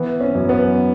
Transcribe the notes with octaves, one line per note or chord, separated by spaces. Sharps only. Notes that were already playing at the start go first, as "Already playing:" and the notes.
Already playing: E3 B3
C#4
F#2
B3